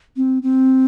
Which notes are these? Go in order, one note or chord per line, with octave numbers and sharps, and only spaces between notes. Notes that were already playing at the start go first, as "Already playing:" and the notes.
C4
C4